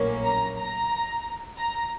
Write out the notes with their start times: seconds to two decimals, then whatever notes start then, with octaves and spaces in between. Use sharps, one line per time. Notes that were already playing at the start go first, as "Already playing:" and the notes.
Already playing: A#1 A2 F#3 A#3 C#4
0.24 A#5
0.58 A#5
1.59 A#5